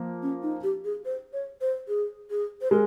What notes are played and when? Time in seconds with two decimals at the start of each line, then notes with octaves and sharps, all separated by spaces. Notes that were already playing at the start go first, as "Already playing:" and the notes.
Already playing: F3 A#3
0.22 C#4
0.42 D#4
0.63 G4
0.84 G#4
1.05 C5
1.33 C#5
1.61 C5
1.88 G#4
2.31 G#4
2.62 C5
2.71 G#3 A#4